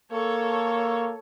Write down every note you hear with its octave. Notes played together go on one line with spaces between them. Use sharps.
A#3 A4 C#5